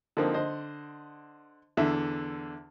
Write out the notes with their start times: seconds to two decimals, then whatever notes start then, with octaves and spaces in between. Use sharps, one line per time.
0.17 D3 F3 A#3 C4 D#4
0.34 D3 C5 D#5
1.77 E2 D3 E4 E5